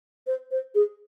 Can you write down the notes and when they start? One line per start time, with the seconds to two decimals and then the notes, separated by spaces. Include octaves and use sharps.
0.27 C5
0.51 C5
0.75 G#4